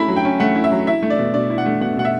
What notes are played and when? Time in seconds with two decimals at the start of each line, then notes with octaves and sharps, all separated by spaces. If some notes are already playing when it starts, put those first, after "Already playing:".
Already playing: A3 C#4 E4 B5
0.08 F#3
0.16 G5
0.25 C#4
0.40 A3 F#5
0.55 E4
0.64 E5
0.71 F#3
0.87 E4 E5
1.02 A3
1.10 D5
1.19 B2
1.34 B2 D5
1.50 E4
1.58 F#5
1.66 A3
1.81 B2 F#5
1.97 B2 F#5
2.05 E5